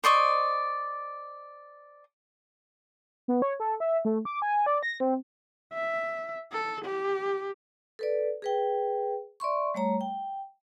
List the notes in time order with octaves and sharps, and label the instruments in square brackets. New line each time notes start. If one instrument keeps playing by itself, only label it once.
[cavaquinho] C5 D5 D#5 C#6
[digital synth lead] B3
C#5
A4
E5
A3
D6
G#5
D5
A#6
C4
[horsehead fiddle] E5
A4
G4
[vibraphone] A4 B4 D5
G#4 B4 G5
D5 E5 C6 C#6
G3 A3 C#5 A#5
G5